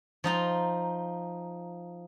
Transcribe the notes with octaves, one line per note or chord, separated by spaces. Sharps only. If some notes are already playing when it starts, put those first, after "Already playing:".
F3 D#4 A#5